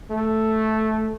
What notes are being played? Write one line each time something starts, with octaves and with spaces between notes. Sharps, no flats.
A3